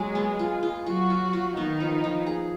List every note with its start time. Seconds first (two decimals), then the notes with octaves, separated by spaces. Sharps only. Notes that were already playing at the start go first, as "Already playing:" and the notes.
Already playing: F#3 G#3 G#4
0.15 B3
0.39 F4
0.63 F4
0.86 F#3 F4 F#4
1.10 F4
1.33 F4
1.56 D#3 B3 D#4
1.80 F3
2.04 F3
2.26 G#4